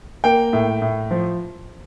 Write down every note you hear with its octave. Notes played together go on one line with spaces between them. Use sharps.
A#3 G5
A2
A2
F3